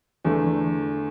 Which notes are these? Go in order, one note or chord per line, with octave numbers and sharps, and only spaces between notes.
E2 D3 E3 A3